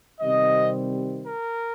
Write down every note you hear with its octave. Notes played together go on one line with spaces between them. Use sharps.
C3 D#3 G3 C4 D#5
A#4